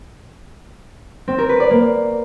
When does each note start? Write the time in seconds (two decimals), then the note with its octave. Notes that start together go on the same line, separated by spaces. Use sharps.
1.28 C4
1.38 A#4
1.49 B4
1.60 D5
1.71 A#3